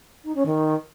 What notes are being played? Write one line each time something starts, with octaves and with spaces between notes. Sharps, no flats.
D#4
C#4
D#3